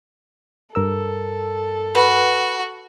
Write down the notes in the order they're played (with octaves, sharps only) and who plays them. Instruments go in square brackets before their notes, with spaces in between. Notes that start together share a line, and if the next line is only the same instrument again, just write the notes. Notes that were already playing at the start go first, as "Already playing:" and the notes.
[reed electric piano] G2 A#4 E6 [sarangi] A4
[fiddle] F#4 [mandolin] B4